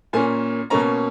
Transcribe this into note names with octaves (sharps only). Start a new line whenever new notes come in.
A#2 A#3 C#4 G#5
B2 A#3 C#4 A#5